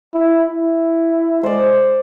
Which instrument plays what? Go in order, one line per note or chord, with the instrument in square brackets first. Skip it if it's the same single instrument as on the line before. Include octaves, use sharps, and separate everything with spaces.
[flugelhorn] E4
E4
[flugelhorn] G#3 [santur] C5 D5